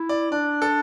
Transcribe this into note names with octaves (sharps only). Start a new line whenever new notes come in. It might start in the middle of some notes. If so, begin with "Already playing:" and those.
Already playing: E4
D5
D4 D5
A4